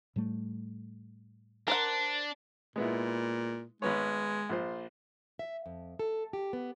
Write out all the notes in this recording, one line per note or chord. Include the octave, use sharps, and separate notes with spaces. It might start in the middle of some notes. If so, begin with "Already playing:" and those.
A2 G3 A3
D4 A#4 C5 F#5
A#2 G#3 B3 E4
G#1 G#3 B3 C#5
A#1 F4 C5
E5
F2
A4
G4
B3